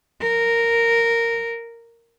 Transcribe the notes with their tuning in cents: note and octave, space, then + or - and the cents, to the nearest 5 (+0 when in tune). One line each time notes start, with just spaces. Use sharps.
A#4 -10